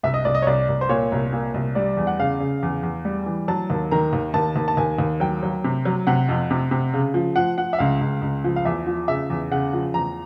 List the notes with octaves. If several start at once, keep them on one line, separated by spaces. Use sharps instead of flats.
C2 E5
D#5
C2 D5
D#5
C#5
C2 D5
C2
C5
A#2 C#5
C2
A#2
C2
G3 D5
E2
F#5
C#3 F5
C#3
E2
E2
G3
E3
F#3 A5
D#2
D#3 A#5
D#2
D#2 A5
D#2
A5
D#2 G#5
D#2
F#3 G5
F#3
C3
F#3
C3 F#5
F2
C3
C3
C#3
F3
F3 F#5
F3 F#5
E5
C#2 F5
C#2
C#2
F3
F5
E2 E5
F3
C#3 E5
E2
C#3 F#5
F3
E2 A#5